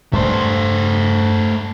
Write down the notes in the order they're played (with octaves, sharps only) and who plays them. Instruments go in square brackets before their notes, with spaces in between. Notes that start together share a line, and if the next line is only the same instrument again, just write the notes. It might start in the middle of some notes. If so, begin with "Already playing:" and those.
[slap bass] G2 G#3 [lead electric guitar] A3 C5